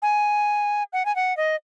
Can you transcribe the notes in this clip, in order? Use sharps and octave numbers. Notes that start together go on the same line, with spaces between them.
G#5
F#5
G#5
F#5
D#5